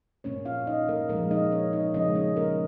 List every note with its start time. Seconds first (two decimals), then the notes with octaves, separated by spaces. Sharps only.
0.24 A#2 A#3 C#4 C#5
0.45 F4 F5
0.67 D#4 D#5
0.89 A#3 A#4
1.09 A#2 F3 G#3 A#3 A#4
1.31 D#4 D#5
1.52 C#4 C#5
1.73 D#4 D#5
1.94 C#3 F3 G#3 C#4 D#4 D#5
2.15 C#4 C#5
2.36 A#3 A#4